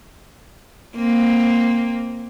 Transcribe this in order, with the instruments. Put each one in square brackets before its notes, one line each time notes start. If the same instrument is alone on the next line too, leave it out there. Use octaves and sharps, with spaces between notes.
[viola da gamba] A#3 C4